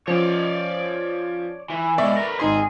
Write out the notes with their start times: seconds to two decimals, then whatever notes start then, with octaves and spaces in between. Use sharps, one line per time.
0.08 F3 C#4 C#5 D5
1.70 E3
1.98 B2 G#3 D5 E5 C#6
2.17 A#4 B4
2.40 G#1 D#4 G#4 C6